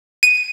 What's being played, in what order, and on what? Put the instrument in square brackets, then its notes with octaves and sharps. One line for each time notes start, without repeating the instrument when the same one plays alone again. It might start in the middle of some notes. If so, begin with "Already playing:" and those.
[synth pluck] D#7